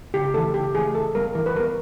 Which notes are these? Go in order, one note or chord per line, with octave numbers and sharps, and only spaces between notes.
C#3 G4
E3 A3 A4
C#3 G4
E3 A3 G#4
E3 A4
G3 B3 A#4
E3 A#4
B4
G3 B3 A#4